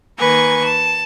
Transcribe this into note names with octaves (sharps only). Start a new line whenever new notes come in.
D#3 A#3 B4 G#5 C#6
A5